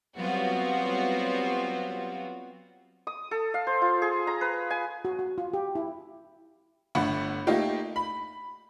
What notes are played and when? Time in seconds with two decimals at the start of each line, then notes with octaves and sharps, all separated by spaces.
0.16 F#3 G3 B3 C4 F4 F#4
3.07 D#6
3.31 A4
3.54 F5
3.67 C5
3.82 F4
4.02 G#4
4.27 A#5
4.41 B4
4.70 G#5
5.05 F#4
5.19 F#4
5.38 F4
5.54 G4
5.75 E4
6.95 G1 D3 A3 F#5 B5
7.47 A3 A#3 D#4 F4 G4
7.96 B5